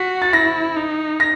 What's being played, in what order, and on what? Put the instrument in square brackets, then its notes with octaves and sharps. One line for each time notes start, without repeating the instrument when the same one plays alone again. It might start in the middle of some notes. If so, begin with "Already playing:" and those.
Already playing: [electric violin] F#4 [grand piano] B6
[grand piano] A6
[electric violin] E4 [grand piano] A#6
[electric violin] D#4
[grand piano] A#6